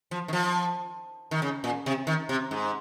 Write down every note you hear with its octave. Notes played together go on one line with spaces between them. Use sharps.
F3
D#3
F3
D#3
C#3
A#2
C3
D#3
C3
G#2